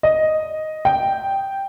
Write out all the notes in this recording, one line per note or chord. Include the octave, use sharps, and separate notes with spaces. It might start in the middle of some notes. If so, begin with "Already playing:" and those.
D#5
G5